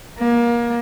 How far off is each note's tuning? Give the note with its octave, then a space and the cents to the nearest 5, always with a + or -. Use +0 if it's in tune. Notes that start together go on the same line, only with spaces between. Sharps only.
A#3 +25